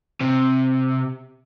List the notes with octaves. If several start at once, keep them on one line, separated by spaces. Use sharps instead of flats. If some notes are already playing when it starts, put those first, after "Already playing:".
C3